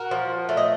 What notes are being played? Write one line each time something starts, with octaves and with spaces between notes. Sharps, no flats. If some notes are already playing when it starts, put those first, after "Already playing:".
Already playing: F#4 A#4
F3
A3 C#5
D#5